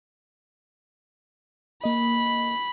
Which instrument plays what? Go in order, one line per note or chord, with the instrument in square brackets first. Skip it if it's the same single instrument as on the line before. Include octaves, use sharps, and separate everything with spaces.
[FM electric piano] A#3 D#5 [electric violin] B5